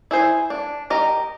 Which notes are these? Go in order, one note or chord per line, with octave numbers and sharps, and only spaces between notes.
E4 G#4 C5
D4
G4 A#4 D#5